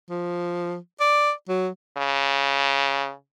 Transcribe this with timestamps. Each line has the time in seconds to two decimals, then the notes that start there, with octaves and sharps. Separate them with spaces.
0.10 F3
1.00 D5
1.49 F#3
1.98 C#3